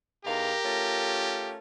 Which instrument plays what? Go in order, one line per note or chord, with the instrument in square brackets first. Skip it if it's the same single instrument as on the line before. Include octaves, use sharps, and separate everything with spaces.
[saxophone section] E2 D#4 F5 [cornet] G4 [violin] A#4 A#6
[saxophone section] A3 C#4 F4